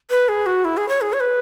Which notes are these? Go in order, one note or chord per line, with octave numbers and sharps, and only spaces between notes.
B4
G#4
F#4
E4
G#4
C#5
G#4
C#5
B4